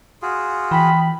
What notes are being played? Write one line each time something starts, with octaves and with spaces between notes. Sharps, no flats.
F4 F#4 G#4
E3 G5 B5